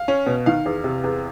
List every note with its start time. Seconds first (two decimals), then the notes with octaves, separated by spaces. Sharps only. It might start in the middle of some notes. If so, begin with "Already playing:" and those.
Already playing: F5
0.08 C#4
0.27 B2
0.46 D#3 F5
0.65 E2
0.84 C3
1.04 E2